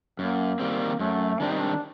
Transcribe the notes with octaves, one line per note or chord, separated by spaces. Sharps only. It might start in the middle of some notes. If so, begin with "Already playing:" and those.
F#2 A#3
D#3 G3 A#3 C4
F#2 A3
D#3 G3 C4 D4
D#4
D4